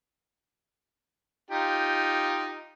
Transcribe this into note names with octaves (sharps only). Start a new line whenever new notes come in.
D#4 F4 G4